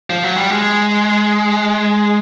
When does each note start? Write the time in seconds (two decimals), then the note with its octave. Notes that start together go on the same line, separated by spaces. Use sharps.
0.10 F3
0.24 F#3
0.36 G3
0.50 G#3